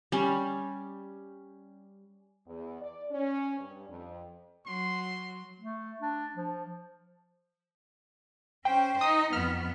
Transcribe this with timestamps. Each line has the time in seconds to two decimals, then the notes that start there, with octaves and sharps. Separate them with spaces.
0.12 G3 C#4
2.47 E2
2.81 D5
3.10 C#4
3.59 G2
3.88 F2
4.66 F#3 F#4 C6
5.60 A3
6.01 D4
6.36 F3
8.65 C#4 C5 G5
9.01 D#4 D#6
9.33 F2 B3 F6